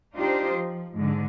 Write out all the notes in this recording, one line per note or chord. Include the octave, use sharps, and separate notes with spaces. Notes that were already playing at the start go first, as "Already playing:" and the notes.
D4 D#4 F4 G4 C5
F3
G#2 D3